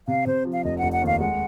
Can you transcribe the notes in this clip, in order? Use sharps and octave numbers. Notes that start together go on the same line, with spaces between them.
C3 F5
C3 C5
F3
F5
F1 D#5
F1 F#5
F#5
D#2 F5
G#3 F#5